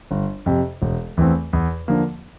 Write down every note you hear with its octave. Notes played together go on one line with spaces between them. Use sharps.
G1
F2 C3
E1
E2 E3 A3 C4
E2
D3 F3 A#3